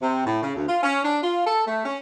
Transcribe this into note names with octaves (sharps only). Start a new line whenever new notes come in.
C3
A2
C#3
D2
F4
C#4
D4
F4
A4
A3
C#4